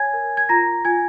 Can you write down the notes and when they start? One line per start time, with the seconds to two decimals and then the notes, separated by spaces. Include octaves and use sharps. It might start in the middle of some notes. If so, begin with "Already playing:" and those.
Already playing: C#5 G#5 G#6
0.13 A#4
0.37 G#6
0.49 F4 A#5 A#6
0.85 F4 G#5 G#6